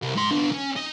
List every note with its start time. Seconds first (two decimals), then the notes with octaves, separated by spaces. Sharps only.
0.02 C2
0.16 G#2 C6
0.31 B3 D4
0.52 C#4
0.76 D#4